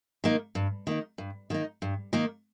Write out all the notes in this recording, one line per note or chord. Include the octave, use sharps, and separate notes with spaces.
D#3 A#3 D#4
G2
D#3 A#3 D#4
G2
D#3 A#3 D#4
G2
D#3 A#3 D#4